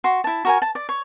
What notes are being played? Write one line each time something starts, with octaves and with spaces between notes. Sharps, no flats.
F#4 C6
E4 A5
F#4 A#4 G#5
A5
D5
C#5